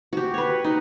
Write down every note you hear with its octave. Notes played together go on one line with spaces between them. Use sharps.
F#4 G4
B4 C#5
D#4